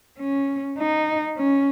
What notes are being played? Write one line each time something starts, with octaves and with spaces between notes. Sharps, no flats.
C#4
D#4
C#4